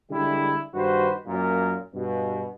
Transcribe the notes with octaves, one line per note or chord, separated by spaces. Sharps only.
D3 G3 G#3 E4
G2 D#3 F#4 B4 C5
F#2 A#2 A#3 A#4
G2 B2